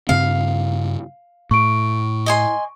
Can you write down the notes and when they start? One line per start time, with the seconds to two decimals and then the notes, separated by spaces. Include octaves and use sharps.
0.09 G2 C#3 C4 F5
1.51 A2 C#6 D7
2.26 D#5 G#5 C6